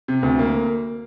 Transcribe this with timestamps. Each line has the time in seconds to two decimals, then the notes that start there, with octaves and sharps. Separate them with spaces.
0.08 C3
0.23 D2
0.39 A#3